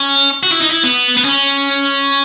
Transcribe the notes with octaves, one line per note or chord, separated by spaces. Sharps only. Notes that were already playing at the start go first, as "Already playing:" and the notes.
Already playing: C#4
F#4
E4
D#4
E4
B3
B3
C#4